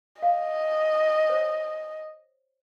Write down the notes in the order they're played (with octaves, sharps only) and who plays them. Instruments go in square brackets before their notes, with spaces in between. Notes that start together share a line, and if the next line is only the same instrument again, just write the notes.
[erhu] D#5 [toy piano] F5
[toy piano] C5 C#5